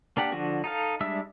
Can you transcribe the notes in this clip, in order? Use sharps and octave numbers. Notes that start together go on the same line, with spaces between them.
A#3 D4 G4 F#5
D3 F3 D4 F#4
D#4 A4 F5
G3 G#3 D4 E5 E6